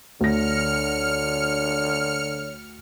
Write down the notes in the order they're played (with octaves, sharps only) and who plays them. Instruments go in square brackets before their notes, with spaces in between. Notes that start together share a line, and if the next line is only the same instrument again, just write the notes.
[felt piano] D2 A#6 [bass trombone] D3 [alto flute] C#5 [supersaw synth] F6 C#7